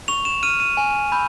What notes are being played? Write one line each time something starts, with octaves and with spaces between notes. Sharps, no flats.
C#6 F7
E7
F6 D#7
D#7
G#5
B5 E6 G6